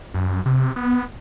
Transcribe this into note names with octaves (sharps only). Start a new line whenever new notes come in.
F#2
C3
B3